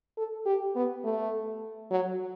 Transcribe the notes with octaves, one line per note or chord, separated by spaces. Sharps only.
A4
G4
B3
A3
F#3